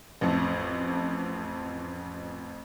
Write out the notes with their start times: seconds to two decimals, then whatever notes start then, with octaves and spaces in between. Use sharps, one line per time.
0.21 A1 F2 A5